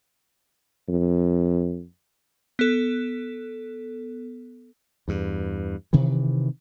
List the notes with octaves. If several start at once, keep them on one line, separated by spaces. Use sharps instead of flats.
F2
B3 A4
E2 G2
C3 D#3 E3